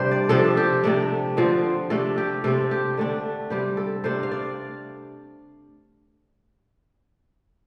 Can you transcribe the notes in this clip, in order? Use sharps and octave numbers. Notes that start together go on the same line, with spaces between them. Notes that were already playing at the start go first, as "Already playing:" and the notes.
Already playing: C3 G3 D4 C5
D5
C3 F3 D4 A4
G4
C3 A3 D4
D3 F3 C4
C3 A3 D4 A4
G4
C3 A3 C4 A4
G4
D3 A3 D4
C3 G3 C4 G4
A4
C3 A3 D4 C5
F5
D5